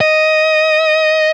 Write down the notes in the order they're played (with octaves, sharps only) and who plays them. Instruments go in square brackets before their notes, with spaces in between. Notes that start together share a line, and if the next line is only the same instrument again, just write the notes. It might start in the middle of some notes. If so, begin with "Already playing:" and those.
[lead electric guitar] D#5